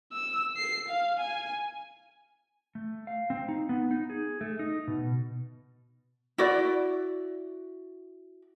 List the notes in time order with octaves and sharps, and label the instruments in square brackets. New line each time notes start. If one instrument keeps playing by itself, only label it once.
[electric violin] E6
C7
F5
G#5
[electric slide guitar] A3
F5
C4
D#4
B3
D#4
G#4
A3
D#4
B2
[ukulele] E4 F#4 D5